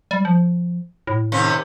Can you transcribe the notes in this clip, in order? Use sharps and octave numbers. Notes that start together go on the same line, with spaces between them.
G3
F3
A2
D#2 C3 C#4